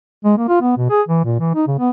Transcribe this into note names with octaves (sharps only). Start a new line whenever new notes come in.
G#3
A#3
F4
B3
B2
G#4
E3
A#2
E3
D#4
C#3
B3